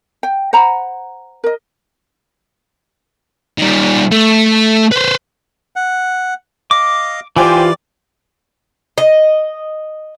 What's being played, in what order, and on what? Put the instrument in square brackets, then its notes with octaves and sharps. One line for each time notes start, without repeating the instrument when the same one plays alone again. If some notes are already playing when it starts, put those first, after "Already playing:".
[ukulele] G5
C5 F#5 A#5 B5
A#4 D#5
[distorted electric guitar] D#3 G3
A3
B4 C5
[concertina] F#5
[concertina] D#5 F5 [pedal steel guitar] D6
[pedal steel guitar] E3 G4 [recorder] F4 [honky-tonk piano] C5 G5 G#5 [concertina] D5 D6
[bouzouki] D#5